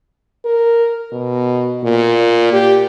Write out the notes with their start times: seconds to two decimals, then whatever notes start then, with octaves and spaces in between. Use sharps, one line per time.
0.45 A#4
1.12 B2
1.84 A#2
2.53 G4